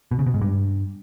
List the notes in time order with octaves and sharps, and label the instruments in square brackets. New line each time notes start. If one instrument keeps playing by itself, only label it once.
[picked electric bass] B2
C#3
B2
G#2
G2